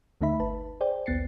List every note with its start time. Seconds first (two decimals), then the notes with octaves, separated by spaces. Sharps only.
0.21 D2 D3 A3 D#4 E5 B5
0.40 G1 B4 A5
0.81 G#4 C5 D5 G5
1.06 A#1 D#2 B3 A6 C7 C#7